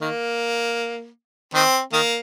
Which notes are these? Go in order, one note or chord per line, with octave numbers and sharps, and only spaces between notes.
D#3 A#3
D#3 C4
D#3 A#3